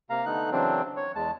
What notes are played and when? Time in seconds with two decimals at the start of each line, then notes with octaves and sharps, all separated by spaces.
0.10 C3 A#3 F5 A#5
0.26 D3 A3 B3 D#4 F#6
0.51 C#3 E3 F#3 C4 D4
0.97 C#5
1.15 E2 G#3 A5